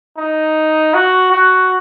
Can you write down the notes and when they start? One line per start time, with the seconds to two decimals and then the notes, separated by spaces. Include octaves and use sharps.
0.17 D#4
0.94 F#4
1.32 F#4